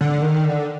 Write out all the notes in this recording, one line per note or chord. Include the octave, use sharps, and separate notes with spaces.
D3
D#3
D3